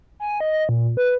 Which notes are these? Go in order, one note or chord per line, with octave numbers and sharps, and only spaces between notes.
G#5
D#5
A#2
B4